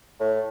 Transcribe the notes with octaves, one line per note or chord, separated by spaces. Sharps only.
A2